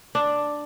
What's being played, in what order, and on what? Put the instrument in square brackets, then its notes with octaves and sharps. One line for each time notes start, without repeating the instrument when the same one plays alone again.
[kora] D4